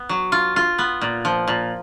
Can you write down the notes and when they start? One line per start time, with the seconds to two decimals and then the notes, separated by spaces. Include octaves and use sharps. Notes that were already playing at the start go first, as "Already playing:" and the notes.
Already playing: B3
0.09 F#3
0.32 F4
0.56 F4
0.79 B3
1.01 A#2
1.25 F3
1.48 A#2